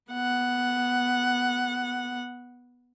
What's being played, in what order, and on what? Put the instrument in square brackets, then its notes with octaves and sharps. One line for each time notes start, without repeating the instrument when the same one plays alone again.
[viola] B3 F#5